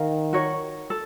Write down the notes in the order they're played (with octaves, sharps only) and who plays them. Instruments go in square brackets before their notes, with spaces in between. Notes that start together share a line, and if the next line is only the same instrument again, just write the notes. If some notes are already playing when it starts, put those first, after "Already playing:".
Already playing: [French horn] D#3 [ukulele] A#4 F5
[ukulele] F#4 A#4 C#5
A4